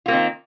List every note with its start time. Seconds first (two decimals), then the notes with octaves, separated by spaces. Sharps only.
0.06 F4
0.08 A#3
0.11 C4
0.13 D#3